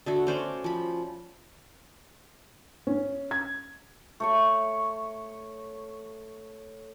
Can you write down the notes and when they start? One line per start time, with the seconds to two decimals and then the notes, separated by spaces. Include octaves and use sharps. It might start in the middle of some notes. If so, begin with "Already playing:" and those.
0.06 D3 A3 F#4
0.27 C#4 C5 D5
0.64 F3 B5
2.87 C#4
3.31 G#6
4.20 A3 C#5 C#6